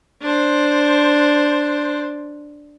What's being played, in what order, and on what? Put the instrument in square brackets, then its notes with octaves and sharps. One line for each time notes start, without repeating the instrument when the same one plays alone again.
[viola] D4 C5